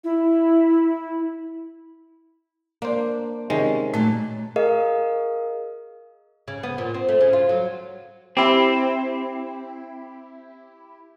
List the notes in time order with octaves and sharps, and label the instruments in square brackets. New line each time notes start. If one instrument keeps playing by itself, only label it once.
[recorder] E4
[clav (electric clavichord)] A#3 C5 [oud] D4
[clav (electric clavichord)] C3 D#3 G#3 [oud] C#4
[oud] A#2 F#3 [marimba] A3
[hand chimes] G#4 A#4 D#5 F5
[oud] C#3
B3
A#2
C4
A3
C#3
F4
F#3
[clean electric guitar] C4 [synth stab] E4 G4